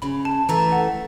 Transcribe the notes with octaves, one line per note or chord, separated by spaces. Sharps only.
C#3 B5
A5
E3 A3 A#5
F#5